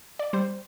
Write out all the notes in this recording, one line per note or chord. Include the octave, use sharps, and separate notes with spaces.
D5
G3 C5